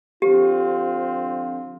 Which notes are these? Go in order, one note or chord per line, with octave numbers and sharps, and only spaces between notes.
D3 F3 C4 F4 G4